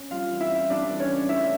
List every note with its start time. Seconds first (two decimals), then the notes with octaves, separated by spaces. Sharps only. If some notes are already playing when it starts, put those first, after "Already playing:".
Already playing: C#4
0.11 G3 F4 F5
0.31 E3
0.41 E4 E5
0.50 C#4
0.70 G3 D4 D5
0.90 E3
1.00 C#4 C#5
1.10 C#3
1.29 A3 E4 E5